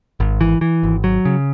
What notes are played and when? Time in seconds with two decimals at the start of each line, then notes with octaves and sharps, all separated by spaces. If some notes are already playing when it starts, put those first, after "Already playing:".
0.20 G#1
0.41 E3
0.61 E3
0.83 G#1
1.04 F#3
1.25 C#3